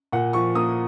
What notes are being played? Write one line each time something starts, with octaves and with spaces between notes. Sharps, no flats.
A#2 F#5
F3 C#6
A#3 D#6